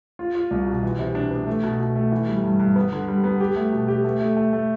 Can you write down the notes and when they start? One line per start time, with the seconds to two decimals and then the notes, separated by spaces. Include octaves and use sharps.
0.19 F4
0.35 F4
0.51 C2
0.67 B2
0.83 E3
0.99 C3
1.15 D4
1.31 B3
1.47 A3
1.63 B2
1.80 B2
1.95 A3
2.12 E3
2.28 G3
2.44 G2
2.59 G2
2.76 B3
2.92 D3
3.08 G3
3.24 B3
3.41 G4
3.56 A3
3.73 B2
3.88 G4
4.04 A3
4.20 A3
4.37 A3
4.53 A3